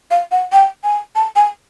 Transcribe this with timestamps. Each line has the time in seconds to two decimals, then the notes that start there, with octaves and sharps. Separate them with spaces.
0.11 F5
0.32 F#5
0.53 G5
0.84 G#5
1.15 A5
1.36 G#5